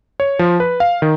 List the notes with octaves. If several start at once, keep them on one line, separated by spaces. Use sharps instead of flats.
C#5
F3
B4
F5
D#3